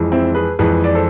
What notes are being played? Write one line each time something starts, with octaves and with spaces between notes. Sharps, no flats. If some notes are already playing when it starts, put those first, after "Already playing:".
Already playing: F2 E3 G#3
C4 E4
G#4 B4
F2 E3 G#3 G#4 B4
D5
A4 C5